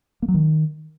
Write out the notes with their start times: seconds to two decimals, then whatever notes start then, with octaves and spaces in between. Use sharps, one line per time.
0.22 A#3
0.28 F#3
0.34 D#3